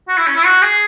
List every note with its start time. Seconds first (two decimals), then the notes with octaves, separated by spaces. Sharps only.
0.08 F#4
0.18 E4
0.26 C#4
0.36 E4
0.45 F#4
0.62 G#4